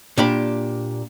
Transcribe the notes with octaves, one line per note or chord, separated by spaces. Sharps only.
A#2 D4 G4 B5